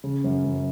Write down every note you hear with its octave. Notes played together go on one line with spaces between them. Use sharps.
C#3
F#2
F#2